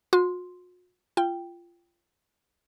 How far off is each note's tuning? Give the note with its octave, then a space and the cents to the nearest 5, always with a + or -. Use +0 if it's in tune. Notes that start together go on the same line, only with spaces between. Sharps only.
F#4 -45 C6 +0
F4 -20 G5 +0